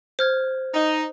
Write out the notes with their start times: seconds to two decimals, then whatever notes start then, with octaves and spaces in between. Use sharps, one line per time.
0.19 C5 F6 G#6
0.74 D#4